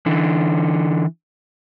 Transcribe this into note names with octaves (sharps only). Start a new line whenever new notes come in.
D3 E3